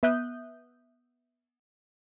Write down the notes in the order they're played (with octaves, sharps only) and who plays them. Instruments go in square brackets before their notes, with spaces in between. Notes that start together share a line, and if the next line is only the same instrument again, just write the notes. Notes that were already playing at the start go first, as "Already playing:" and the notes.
[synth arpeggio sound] B3 E5 D#6 F#6 G6